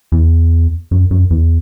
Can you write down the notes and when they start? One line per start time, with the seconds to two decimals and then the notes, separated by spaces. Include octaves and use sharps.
0.12 E2
0.91 F#2
1.11 F#2
1.30 E2